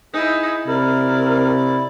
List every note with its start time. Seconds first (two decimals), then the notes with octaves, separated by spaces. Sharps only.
0.13 D#4 E4 G#4
0.67 C3 E4 A#4 D5